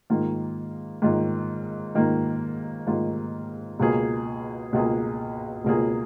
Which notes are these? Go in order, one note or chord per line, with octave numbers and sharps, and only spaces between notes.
G#2 D#3 A#3 F4
G#2 D#3 A#3 F4
G#2 D#3 A#3 F4
G#2 D#3 A#3 F4
C#2 B2 A#3 F4 G#4
C#2 B2 A#3 F4 G#4
C#2 B2 A#3 F4 G#4